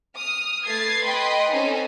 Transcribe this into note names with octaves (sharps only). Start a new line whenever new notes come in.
D#6 F6
A3 B4 G#6 A6 C7
B4 D#5 G5 B5 C6
C4 C#4 D#4 A4 G#5